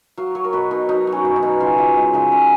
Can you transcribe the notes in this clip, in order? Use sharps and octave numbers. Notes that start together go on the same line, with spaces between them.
F#3 F5
F#3 C#5
A#4
B2 B4
B2 D#4
F#3 D#4
F#3
C#4
B2
D#4
B2
C#3 F4
F3 F4
G#3
C#3 D#4
C#3 C#4